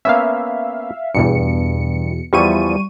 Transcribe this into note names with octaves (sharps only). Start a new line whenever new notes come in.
A#3 B3 C#4 E5 F5
E2 G2 B2 C#7
E2 F3 G3 E4 C#6 D#7